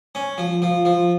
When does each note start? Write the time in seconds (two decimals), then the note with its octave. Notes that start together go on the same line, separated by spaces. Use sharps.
0.15 C#4
0.38 F3
0.62 F3
0.85 F3